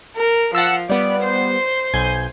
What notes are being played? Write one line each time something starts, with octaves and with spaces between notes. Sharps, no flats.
A#4
F3 F#5 A5 E6
G3 B3 D5
C5
B1 G#5 G6